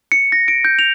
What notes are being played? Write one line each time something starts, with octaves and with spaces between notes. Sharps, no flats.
C#7
A#6
D7
G6
F7